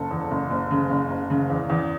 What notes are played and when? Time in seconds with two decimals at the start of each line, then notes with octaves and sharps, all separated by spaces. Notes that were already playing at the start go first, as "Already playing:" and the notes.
Already playing: F#1 A4
0.11 E2
0.31 F#1
0.51 F#1
0.71 C#3
0.90 F#1
1.10 F#1
1.30 C#3
1.50 E2
1.70 E2